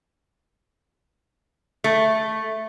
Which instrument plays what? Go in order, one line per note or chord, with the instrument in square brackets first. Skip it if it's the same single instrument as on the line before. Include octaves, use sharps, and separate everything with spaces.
[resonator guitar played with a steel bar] A3